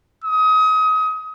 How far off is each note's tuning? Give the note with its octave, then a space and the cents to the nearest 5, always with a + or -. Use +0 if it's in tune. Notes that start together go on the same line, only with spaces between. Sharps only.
D#6 +25